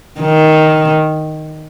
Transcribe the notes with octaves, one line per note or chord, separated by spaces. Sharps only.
D#3